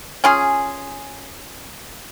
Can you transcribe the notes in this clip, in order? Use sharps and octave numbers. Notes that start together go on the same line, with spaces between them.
C#4 F4 G#4